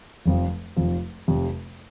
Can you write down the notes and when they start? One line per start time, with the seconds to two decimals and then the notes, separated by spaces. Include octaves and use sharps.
0.26 F1 F2 F3
0.76 F1 F2 F3
1.28 F1 F2 C3